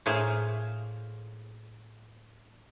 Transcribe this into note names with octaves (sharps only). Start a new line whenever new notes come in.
A2 A#3 G#4 C5 F5